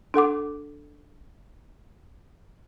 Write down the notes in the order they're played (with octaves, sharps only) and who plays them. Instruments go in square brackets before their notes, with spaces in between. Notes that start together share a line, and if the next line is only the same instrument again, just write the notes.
[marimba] D4 A4 F#5 D6